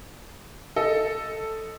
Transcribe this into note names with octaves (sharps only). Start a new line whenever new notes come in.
A4 D#5